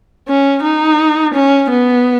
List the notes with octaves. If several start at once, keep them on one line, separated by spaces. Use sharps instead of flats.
C#4
D#4
C#4
B3